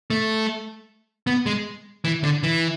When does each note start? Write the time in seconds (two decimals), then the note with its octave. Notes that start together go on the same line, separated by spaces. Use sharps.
0.10 A3
1.27 B3
1.46 G#3
2.04 E3
2.23 D3
2.43 E3